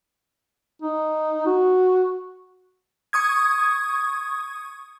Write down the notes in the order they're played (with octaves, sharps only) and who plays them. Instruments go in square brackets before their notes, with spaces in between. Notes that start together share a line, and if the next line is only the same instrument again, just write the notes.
[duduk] D#4
F#4
[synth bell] C#6 D#6 G#6